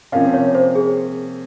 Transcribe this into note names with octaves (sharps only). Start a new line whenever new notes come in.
C3 F3 A#3 C#4 F5
C#5
C5
G#4